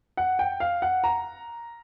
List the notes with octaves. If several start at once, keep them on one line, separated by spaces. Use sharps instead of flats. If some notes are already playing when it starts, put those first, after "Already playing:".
F#5
G5
F5
F#5
A#5